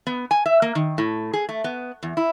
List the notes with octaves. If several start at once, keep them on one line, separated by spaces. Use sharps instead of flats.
B3
G#5
E5
A#3
D#3
A2
G#4
A3
B3
E2
E4